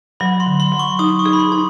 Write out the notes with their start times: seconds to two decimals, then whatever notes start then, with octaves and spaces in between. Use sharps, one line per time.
0.20 F#3 B5
0.40 C6
0.46 D3
0.60 C6
0.72 F#3
0.79 C#6
0.99 D#4 D#6
1.19 C#6
1.26 G#4
1.33 B5
1.39 C6
1.52 D#4